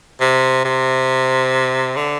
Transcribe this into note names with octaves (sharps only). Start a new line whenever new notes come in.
C3
C3
D3